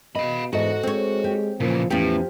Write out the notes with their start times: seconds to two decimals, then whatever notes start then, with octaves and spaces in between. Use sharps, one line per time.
0.15 B2 D#5 F5 B5
0.53 E2 G#2 F#4 A4 D#5
0.83 G#3 C4 C#5
1.24 G4
1.60 A#2 C#3 E3 F3
1.90 E2 A2 E3 F3 C#4 G4